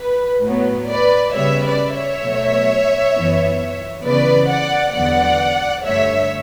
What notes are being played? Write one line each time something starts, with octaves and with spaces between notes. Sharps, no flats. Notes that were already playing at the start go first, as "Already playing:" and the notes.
Already playing: B4
A2 F#3 B3
B4 D5
C#3 G3 B3 C#5 E5
B4 D5
C#5 E5
B2 F#3 A3
F#2 E3 B3
C#3 E3 B3 B4 D5
D5 F#5
E2 D3 F#3 B3 D5 F#5
G2 D3 A3 C#5 E5